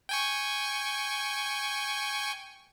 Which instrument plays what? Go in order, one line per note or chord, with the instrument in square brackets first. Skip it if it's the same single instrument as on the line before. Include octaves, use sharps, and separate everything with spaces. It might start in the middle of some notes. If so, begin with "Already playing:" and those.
[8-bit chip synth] G5 G#5 C#6